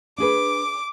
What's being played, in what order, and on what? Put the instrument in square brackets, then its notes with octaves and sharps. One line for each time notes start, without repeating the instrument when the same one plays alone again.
[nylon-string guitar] D4 G#4 B4 [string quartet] D6